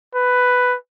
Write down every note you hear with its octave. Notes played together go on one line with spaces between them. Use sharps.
B4